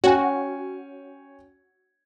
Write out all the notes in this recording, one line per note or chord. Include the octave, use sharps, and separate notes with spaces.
C#4 F#4 C#5 G5 G#5